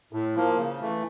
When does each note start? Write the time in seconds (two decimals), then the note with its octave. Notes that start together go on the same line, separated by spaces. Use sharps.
0.13 A2
0.35 F3 A#3
0.58 C#3
0.80 E3 A3